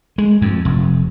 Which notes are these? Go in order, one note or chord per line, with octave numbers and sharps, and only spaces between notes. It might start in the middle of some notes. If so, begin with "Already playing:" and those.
G#3
F2
F1